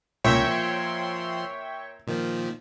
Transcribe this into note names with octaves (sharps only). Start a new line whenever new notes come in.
C#2 A#2 C#5 E5 G5
F3 C6
A#2 D#3 F3